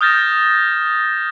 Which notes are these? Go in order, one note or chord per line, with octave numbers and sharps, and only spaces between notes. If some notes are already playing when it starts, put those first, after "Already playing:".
D#6 F6 G6 A6 A#6 E7